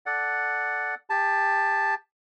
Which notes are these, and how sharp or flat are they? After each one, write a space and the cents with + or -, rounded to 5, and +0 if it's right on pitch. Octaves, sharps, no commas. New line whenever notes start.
A4 -15 D5 +0 F#5 +0
G4 +25 A5 +0